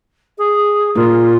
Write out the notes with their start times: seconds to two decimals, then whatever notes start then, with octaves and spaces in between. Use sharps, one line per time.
0.38 G#4
0.95 A#2 A#3 F4